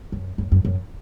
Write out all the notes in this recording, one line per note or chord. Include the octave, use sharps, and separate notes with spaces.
F#2
F#2
F#2
F#2